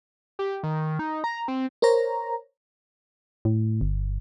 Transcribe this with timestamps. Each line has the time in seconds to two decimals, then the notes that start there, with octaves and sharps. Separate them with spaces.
0.39 G4
0.63 D#3
0.99 D#4
1.24 A#5
1.48 C4
1.82 A#4 C5 C#5 A#5
3.45 A2
3.81 G1